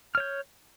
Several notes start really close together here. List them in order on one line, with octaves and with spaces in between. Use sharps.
F6 C#5 G6